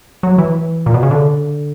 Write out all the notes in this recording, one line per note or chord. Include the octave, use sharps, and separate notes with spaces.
F#3
E3
A#2
B2
C#3
D3